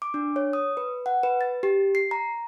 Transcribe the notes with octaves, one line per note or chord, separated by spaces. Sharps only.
D6
D4
C#5
D#6
B4
F#5
B4
A6
G4
C7
A#5